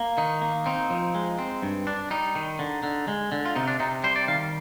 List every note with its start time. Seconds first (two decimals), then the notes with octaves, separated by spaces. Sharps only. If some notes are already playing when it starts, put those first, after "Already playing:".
Already playing: A#3
0.18 D#3 D#4
0.42 A#3
0.66 C4 D#4
0.90 F3
1.15 G#3
1.39 C4
1.62 G2
1.87 D4
2.11 G3 D#4
2.35 D#3
2.59 D3
2.83 D3
3.08 G#3
3.32 D3
3.46 F4
3.56 C3 D#4
3.67 D4
3.80 C3 D#4
4.04 G3 C5
4.16 D5
4.28 D#3 F5